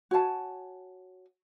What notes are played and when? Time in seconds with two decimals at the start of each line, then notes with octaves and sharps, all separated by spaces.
0.11 F#4 C#5 G#5 A5